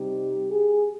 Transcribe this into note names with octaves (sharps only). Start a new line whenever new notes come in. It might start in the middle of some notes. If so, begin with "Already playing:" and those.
Already playing: C3 G3 C4 D#4 G4
G#4